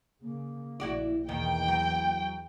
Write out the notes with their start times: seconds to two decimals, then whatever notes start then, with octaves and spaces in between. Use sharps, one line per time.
0.22 C#3 A#3
0.80 A#1 E4 F#4 D5
1.29 E2 B2 D#3 E3 A#3 G5
1.68 F#3